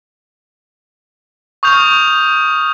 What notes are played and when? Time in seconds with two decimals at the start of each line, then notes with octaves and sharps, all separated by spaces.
1.63 C#6 D#6 F6 G6 F7